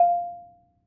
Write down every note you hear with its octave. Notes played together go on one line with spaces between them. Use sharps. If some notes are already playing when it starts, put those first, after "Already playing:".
Already playing: F5